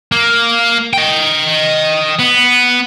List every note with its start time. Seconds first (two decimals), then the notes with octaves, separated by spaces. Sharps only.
0.12 A#3
0.93 D#5 G5
2.19 B3